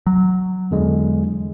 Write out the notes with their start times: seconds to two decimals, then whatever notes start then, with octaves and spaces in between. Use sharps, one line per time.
0.07 F#3
0.71 E2 D3 G#3